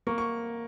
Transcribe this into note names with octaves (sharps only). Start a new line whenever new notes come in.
A#3 C#6
C#6